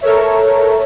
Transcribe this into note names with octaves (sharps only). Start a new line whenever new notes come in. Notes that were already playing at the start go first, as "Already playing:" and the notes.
A4 A#4 C#5 E5